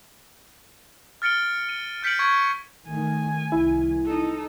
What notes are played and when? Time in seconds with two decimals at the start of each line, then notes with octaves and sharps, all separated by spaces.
1.22 F6 A6 C#7 D7 G7
1.69 D#7
2.03 F6 G6 B6 C#7 D7 F#7
2.19 C#6 G#6
2.88 D#3 A3 G#5
3.52 C2 D#3 E4
4.06 D#4 A4